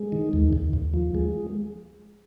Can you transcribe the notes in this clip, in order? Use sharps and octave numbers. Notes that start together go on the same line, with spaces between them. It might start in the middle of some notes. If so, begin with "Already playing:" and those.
Already playing: G#3
D#3
D#2
D#2
D#2
F3
G#3